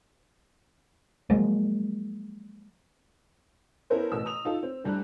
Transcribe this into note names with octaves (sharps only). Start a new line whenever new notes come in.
F3 F#3 G#3 A#3
B3 C#4 E4 A4 A#4 C5
A1 B2 E6
A#5 D#6 F7
D#4 F4 A4
C4
D2 G3 D4 A#5 F#6